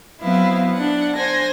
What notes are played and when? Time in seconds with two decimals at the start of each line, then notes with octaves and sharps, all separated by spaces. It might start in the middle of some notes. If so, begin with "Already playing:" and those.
0.22 F#3 B3 C4 E4 F5
0.72 D4 F#5
1.16 C5 G#5 A#6